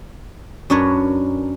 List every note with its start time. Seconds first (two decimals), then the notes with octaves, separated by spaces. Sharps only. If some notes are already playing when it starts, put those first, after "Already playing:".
0.70 F#2 C#4 D4 A#4 B4 C#5